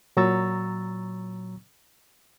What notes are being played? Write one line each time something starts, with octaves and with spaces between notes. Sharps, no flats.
A#2 F#3 A#5 C#6 E6 A6